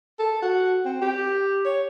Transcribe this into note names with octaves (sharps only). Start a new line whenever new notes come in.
A4
F#4
C4
G4
C#5